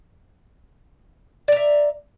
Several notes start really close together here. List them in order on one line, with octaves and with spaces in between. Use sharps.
D5 A#5 E5